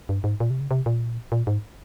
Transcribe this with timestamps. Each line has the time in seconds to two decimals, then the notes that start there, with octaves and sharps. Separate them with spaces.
0.09 G2
0.24 G#2
0.40 A#2
0.50 C3
0.60 C#3
0.71 C3
0.86 A#2
1.32 A#2
1.47 G#2